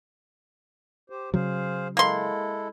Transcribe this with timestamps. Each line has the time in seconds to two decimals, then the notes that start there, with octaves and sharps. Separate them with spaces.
1.10 G4 C5
1.34 C#3 F#3 G#4 C5 F5
1.97 G#3 A#3 E4 A4 C6